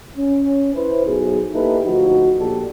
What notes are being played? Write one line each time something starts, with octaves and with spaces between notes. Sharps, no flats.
C#4
E4 B4 C5
B1 G#4
A#3 D#4 E4 G4 A4 B4
D2 F3 D#4 F#4
A#1 A#2 D4 G4 A4